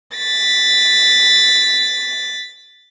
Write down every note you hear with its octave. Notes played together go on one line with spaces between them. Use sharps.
A6 B6